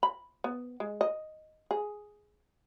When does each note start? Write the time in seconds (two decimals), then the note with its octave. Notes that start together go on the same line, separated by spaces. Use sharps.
0.03 B5
0.44 B3
0.80 G#3
1.01 D#5
1.71 G#4